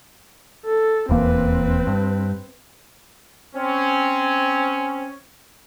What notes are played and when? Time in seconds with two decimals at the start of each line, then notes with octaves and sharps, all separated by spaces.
0.66 A4
1.09 D#1 E2 A#3 C4 B4
1.87 G2
3.55 C4 C#4